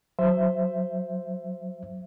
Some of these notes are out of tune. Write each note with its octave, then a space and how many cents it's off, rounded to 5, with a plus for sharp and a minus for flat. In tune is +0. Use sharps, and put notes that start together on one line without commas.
F#3 +0 C5 +0 E5 +10